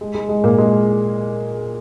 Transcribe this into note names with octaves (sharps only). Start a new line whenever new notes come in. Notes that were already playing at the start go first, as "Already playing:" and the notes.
G#3
G#3
G#3
A#2 A#3
G#3